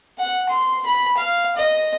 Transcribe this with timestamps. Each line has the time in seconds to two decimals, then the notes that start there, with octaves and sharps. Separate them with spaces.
0.19 F#5
0.49 C6
0.86 B5
1.17 F5
1.57 D#5